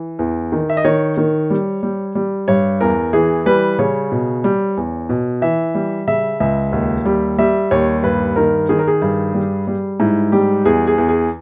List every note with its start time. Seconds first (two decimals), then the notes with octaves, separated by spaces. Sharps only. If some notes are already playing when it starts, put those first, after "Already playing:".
Already playing: E3
0.19 E2
0.52 D#3
0.70 E5
0.77 D#5
0.85 D#3 C#5
1.17 D#3
1.50 G3
1.83 G3
2.15 G3
2.48 G2 C#5
2.81 E2 A#4
3.13 E3 G#4
3.46 G3 B4
3.79 C#3 C#5
4.12 B2
4.44 G3
4.77 E2
5.09 B2
5.42 E3 E5
5.75 G3
6.07 C#3 E5
6.40 C#2 E5
6.72 D#2
7.05 G3
7.39 G3 E5
7.71 D#2 C#5
8.03 G2 B4
8.36 D#3 A#4
8.69 D#3 G#4
8.79 A#4
8.87 G#4
9.02 G2
9.34 G3
9.67 G3
10.00 G#2 E4
10.32 G3 G4
10.65 E2 G#4
10.87 G#4
10.98 E2
11.09 G#4